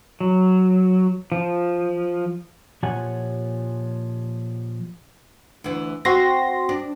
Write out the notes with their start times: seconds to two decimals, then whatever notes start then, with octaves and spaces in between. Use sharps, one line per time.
0.20 F#3
1.32 F3
2.83 A#2 F3 G4 C#5 F#5 G#5
5.64 D2 E3
6.05 C4 F#4 C6 A#6
6.69 D4